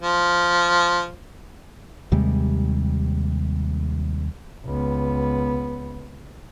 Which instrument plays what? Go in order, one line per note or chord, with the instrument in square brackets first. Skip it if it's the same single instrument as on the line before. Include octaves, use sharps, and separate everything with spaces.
[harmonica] F3
[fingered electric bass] D#2 C3 G3 G#3
[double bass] C#2 B3